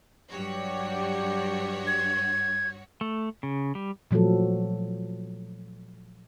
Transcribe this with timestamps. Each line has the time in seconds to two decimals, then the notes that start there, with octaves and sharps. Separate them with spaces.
0.31 G2 F#3 F#4 G4 C#5 D5
1.87 G#6
3.01 A3
3.43 C#3
3.75 G3
4.11 A#2 F3 F#3 A3 A4